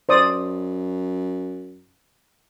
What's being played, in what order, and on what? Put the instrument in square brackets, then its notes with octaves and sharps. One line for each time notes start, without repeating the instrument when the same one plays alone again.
[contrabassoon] F#2 [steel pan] C5 D5 D#6